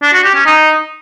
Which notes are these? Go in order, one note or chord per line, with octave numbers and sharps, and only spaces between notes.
D4
F#4
G4
C#4
D#4